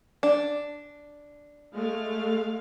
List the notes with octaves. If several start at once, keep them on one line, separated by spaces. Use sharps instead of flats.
D4
G#3 A3 F5